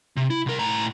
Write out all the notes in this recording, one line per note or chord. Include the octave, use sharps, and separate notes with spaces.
C3
E4
C2 A#4
A2 A#5